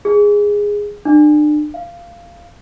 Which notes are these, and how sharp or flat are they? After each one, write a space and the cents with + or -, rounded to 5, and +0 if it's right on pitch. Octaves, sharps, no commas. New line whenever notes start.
G#4 -10
D4 +35
F5 -15